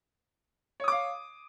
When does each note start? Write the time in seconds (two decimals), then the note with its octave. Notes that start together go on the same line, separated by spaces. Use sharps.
0.80 C#5
0.84 D#6
0.88 D6
0.92 F5